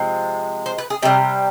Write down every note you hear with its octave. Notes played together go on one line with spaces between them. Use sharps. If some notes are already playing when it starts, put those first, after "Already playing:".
Already playing: C3 F3 G#3
C5
B4
G#4
C3 G3 G4